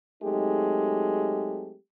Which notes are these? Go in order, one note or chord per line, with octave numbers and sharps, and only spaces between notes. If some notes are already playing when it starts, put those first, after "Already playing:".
F#3 G#3 A3 C4 D#4 G4